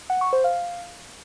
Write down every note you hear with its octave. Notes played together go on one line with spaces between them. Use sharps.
F#5
C#6
C5
F5